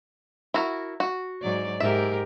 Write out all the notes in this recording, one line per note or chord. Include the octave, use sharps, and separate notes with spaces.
E4 F#4 A#4
F#4
G#2 F#3 D5
G#2 G4 A#4 E5